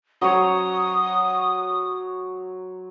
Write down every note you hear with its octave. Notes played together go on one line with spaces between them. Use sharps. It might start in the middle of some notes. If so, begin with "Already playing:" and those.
F#3 C5 C#5 D#6